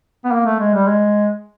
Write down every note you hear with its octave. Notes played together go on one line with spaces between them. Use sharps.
B3
A#3
A3
G#3
G3
G#3